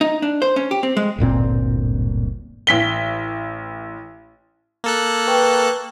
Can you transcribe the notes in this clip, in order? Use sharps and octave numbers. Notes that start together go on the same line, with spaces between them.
D#4
D4
C5
C#4
G4
C4
G#3
D1 G1 A#2 C4
A1 B6 G7
A#3 A4 F#6
B4 G5 C#6